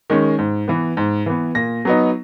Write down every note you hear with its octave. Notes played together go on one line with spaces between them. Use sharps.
D#3 G#3 C#4
G#2
E3 B3
G#2
E3 B3
A#2 A#6
F#3 B3 D#4